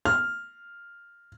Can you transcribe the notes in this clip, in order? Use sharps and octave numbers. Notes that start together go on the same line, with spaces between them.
F6